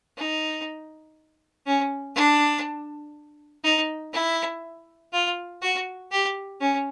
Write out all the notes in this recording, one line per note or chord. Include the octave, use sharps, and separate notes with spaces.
D#4
C#4
D4
D#4
E4
F4
F#4
G4
C#4